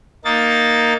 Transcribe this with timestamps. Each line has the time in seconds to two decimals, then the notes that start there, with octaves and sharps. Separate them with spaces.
0.25 A#3 D#4 A6